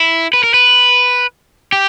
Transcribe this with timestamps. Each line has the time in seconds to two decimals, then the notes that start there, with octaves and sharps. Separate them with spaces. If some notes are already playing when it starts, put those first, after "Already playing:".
Already playing: E4
0.33 B4
0.43 A#4
0.54 B4
1.72 G4